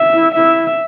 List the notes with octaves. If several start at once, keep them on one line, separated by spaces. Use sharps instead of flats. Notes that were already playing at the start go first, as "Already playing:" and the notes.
Already playing: E5
E4
E4 E5